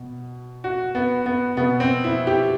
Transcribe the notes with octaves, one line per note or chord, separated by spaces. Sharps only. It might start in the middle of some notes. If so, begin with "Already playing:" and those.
Already playing: B2
F#4
B3
B3
B2 B3
C4
E4
G4